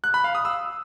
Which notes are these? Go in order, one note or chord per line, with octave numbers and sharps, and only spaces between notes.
F#6
B5
F5
D#6
E6